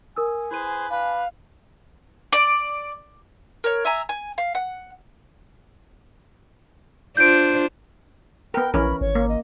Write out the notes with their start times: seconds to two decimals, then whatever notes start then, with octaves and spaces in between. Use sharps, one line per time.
0.16 A#4 G#5 D#6 E6
0.51 E4 G#4 B4 C5 D#7
0.90 D4 B4 F5
2.32 D5
3.64 A#4 C#5
3.85 E5 G#5 A#5
4.09 G#5
4.38 F5
4.55 F#5
7.17 D4 F4 C5 G6 D7
8.54 B3 A#4 G5
8.74 A#1 E3 C#4 A#4 B5
9.01 G#1 C#5
9.15 A#3
9.29 D#5